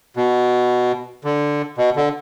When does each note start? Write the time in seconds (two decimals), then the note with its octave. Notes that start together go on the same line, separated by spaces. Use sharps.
0.17 B2
1.24 D3
1.78 B2
1.96 D3